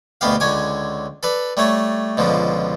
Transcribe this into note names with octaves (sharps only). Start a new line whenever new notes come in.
D2 B2 B3 G4 F5
C#2 D3 C#5 G#5 D6
A4 B4 D5
G3 A3 C#5 A5
C#2 B2 D3 F3